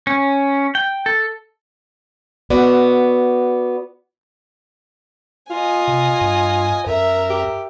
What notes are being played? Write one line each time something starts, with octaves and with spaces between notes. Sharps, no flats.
C#4
G5
A4
B3 F#4 D5
F4 D#5 G#5
C3
G2
F#2 A#4 E5
G4